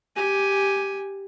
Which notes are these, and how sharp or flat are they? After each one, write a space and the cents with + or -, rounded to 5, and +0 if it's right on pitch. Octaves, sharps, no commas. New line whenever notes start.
G4 +0 G#5 +0